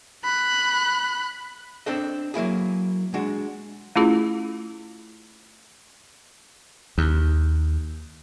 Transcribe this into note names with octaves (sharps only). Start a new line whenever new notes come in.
B5 F#6
C4 D4 A4 D#5
F#3 A#3 E4 G#4
G#3 D4 F#4
A3 C#4 E4 F4 G#4
D#2